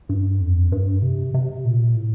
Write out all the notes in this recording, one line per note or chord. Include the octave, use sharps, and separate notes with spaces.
G2
F2
G2
C3
C3
A#2
A2